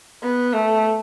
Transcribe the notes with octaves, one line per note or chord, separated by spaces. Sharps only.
B3
A3